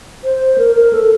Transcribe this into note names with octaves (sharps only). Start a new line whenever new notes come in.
C5
A#4
A#4
A4